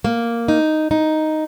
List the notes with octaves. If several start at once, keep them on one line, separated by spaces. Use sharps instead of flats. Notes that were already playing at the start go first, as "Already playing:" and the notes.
A#3
D#4
D#4